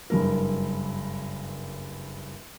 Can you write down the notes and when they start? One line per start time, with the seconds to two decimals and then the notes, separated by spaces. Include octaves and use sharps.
0.10 F#1 G2 A#4